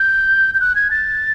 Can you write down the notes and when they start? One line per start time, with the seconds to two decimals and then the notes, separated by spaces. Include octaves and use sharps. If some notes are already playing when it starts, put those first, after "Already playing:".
Already playing: G6
0.55 G6
0.60 F#6
0.75 G#6
0.91 A6